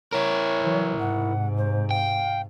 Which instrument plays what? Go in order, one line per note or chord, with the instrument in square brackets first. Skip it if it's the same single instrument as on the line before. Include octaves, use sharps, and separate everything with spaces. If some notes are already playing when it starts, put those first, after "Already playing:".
[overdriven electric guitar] E4 A#4 [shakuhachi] C#5
[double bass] E3 F#3
[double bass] G#2 C3 [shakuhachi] F#5
[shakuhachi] C5
[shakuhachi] F5 [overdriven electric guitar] G5